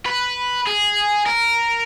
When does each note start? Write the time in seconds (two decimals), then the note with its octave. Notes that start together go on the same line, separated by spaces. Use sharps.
0.06 B4
0.67 G#4
1.26 A#4